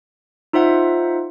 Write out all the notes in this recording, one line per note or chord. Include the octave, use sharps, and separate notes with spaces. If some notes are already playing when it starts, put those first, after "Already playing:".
D#4 F4 C5 E5 F#5